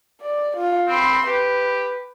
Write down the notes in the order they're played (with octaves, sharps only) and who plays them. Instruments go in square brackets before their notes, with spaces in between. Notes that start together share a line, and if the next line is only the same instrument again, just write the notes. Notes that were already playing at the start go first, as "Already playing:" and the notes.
[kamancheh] D5
F4
[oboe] C4 [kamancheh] B5 C6
[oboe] G4 [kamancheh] B4